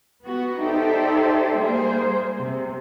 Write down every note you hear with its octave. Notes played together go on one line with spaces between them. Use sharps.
B3 F#4
D#4 G4 A4 C5 D5 E5
G3 A#3 G#4 C5
C3